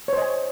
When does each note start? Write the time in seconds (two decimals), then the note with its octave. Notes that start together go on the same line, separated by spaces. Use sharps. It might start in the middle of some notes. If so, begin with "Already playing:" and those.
0.08 C#5
0.13 C5
0.17 D#5
0.22 G#5